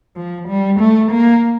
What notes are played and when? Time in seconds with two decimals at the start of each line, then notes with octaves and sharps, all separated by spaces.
0.16 F3
0.48 G3
0.79 A3
1.11 A#3